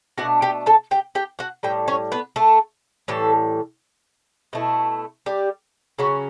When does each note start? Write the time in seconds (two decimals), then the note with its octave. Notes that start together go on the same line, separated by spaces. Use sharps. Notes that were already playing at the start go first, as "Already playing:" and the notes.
0.18 B2 A3 D4 F#4 F#5
0.42 G4 G5
0.66 A4 A5
0.91 G4 G5
1.15 G4 G5
1.39 F#4 F#5
1.63 A2 G3 G5
1.88 C#4 C#5
2.12 B3 B4
2.36 A3 A4
3.08 A2 E3 G3 A4
4.53 B2 A3 E4
5.26 G3 G4
5.99 C#3 F#3 C#4 F#4